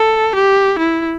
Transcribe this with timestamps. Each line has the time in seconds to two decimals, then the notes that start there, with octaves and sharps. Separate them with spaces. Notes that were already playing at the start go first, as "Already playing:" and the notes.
Already playing: A4
0.35 G4
0.78 E4